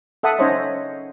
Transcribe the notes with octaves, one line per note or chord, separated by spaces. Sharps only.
A4 E5 F#5 A5 D#6
C#4 D#4 C5 C#5 D#5 E5